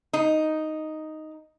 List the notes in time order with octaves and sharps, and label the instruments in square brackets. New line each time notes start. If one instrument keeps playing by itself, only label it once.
[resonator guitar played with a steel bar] D#4